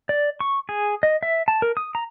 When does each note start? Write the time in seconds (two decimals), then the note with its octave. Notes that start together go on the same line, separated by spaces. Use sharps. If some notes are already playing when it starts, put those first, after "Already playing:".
0.09 D5
0.40 C#6
0.69 G#4
1.03 D#5
1.23 E5
1.48 A5
1.62 A#4
1.77 D#6
1.95 A#5